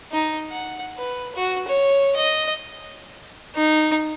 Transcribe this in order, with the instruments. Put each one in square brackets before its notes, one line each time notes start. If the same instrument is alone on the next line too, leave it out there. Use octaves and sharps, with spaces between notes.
[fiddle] D#4
F#5
B4
F#4
C#5
D#5
[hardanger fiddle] D#4